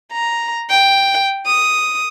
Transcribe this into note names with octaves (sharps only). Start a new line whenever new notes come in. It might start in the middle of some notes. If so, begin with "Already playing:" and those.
A#5
G5
D#6